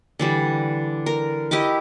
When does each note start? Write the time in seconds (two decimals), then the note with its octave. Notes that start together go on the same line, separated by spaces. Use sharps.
0.19 D3 E3 G3
1.06 A#4
1.51 E4 G4 D#5 D6